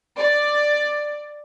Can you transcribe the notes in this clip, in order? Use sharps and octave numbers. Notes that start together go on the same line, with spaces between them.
D5